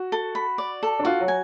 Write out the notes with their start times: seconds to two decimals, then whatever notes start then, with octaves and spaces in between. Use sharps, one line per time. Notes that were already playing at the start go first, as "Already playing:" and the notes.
Already playing: F#4
0.12 A4
0.35 B5
0.58 D5
0.83 A4
0.99 D4
1.05 F4 F#4
1.21 F#3
1.28 G#5